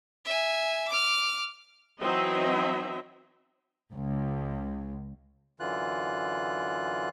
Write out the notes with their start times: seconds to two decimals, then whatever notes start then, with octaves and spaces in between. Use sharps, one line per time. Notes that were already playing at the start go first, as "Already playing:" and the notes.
0.25 E5 G#5
0.88 D6 F6
2.01 E3 F#3 C4 D#4 D#5 E5
3.91 C#2
5.60 F#2 D3 E3 F4 F#6